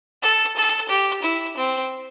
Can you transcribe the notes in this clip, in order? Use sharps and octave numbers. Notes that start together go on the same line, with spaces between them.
A4
A4
G4
E4
C4